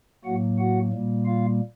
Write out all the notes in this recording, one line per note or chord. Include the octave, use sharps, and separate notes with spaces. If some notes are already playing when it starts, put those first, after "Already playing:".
A2 F#3 A#3 F#4 F#5
F#4 F#5
A#2 G3 A#3
F4 F5